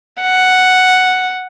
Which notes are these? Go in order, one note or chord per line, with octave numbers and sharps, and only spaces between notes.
F#5